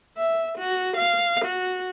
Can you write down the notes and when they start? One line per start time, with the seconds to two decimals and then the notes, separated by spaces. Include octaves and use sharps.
0.17 E5
0.58 F#4
0.96 F5
1.45 F#4